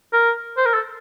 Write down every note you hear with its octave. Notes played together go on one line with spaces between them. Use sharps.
A#4
C5
A#4
A4